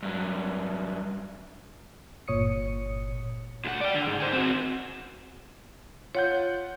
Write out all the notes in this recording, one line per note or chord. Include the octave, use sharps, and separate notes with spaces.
G2 F#3
G1 A#2 C#5 D#6 C#7
D2 F#5
D5 G5
D3
G#2
G#4 C5
C4 F#4
F4 C#5 F#5 G6